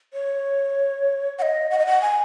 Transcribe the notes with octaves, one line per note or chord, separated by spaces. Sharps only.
C#5
F#5
D#5
F#5
D#5
F#5
G#5